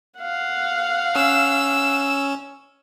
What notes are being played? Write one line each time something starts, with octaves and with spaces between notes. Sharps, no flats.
F5 F#5
C#4 E6